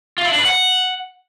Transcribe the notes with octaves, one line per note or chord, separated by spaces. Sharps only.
F4
E4
D4
B4
F#5